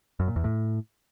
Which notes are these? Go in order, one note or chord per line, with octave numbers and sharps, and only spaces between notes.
F#2
A#2
E2
A2